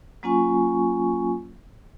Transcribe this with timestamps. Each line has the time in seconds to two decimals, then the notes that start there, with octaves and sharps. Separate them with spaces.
0.23 F#3 A#3 C#4 F4 G#5 C#6